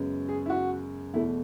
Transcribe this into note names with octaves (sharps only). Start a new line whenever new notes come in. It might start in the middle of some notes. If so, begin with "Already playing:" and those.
Already playing: F#2 C#3 G#3 B3
G#4
E4
F#4
E2 B2 A3 E4